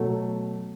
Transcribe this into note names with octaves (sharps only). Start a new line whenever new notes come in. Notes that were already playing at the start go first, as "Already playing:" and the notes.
Already playing: B2 F#3 A3